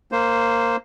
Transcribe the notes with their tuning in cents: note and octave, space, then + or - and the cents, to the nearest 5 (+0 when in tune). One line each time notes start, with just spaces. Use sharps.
A#3 -10 C5 +0